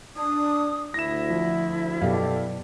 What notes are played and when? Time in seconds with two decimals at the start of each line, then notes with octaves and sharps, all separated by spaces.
0.16 D4 D#6
0.94 D2 E4 A#6 E7
1.30 F3
2.01 F#2 B2 G4 A4 D5 F5